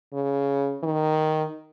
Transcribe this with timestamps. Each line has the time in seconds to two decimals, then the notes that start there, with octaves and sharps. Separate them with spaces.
0.13 C#3
0.83 D#3